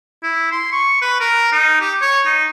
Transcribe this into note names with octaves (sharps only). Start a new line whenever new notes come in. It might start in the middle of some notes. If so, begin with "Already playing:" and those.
E4
C6
C#6
B4
A#4
D#4
G4
C#5
D#4